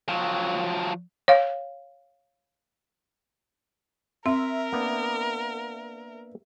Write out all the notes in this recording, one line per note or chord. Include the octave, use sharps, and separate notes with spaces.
F3 F#3
C#5 F5
C4 A#4 E5
A#3 B3 D4